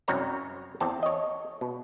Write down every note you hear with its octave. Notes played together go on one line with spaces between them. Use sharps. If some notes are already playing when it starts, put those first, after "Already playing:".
C2 F#2 C4 C#5 A#5
E2 C4 A5
C#5 D#5
B2